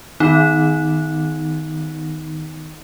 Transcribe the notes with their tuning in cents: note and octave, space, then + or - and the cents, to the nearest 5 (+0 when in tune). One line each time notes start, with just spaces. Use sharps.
D#3 +0 B3 +30 D#4 +15